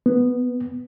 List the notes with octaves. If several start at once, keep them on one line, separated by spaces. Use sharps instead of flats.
B3